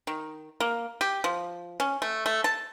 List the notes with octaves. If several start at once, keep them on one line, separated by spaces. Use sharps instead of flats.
D#3
A#3
G4
F3
C#4
A3
A3
A5